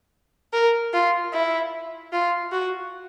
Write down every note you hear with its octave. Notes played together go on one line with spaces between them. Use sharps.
A#4
F4
E4
F4
F#4